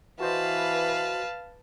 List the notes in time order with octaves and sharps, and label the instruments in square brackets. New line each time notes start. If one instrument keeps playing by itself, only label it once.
[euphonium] E3 [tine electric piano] F#4 C5 D#5 [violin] B4 A5 [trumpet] F5